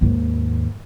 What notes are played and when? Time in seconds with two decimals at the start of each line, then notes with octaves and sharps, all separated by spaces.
0.01 D#2 G#2